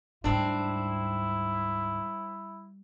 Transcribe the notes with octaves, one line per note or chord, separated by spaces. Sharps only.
D2 G#2 G3 C4 D4 E4